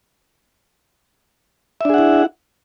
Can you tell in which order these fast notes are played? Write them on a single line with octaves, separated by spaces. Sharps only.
E5 D4 G#4 F#5 E4